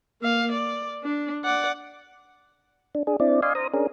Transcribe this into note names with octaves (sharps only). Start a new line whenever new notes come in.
A#3 F5
D5
D4
D5 F#5
D4
D4 G#4
C4 D4 E4 D5
D5 D#5 F5 G#5 C6
C5 A#5 D#6
C#4 D4 G#4 A#4